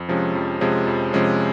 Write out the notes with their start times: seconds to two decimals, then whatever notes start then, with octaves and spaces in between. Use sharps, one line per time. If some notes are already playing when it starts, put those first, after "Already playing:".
Already playing: F2
0.09 C3 F3 G#3 C#4
0.35 F2
0.61 C3 F3 G#3 C#4
0.87 F2
1.13 C3 F3 G#3 C#4